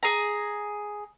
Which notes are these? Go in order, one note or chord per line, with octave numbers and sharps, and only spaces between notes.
G#4 A#5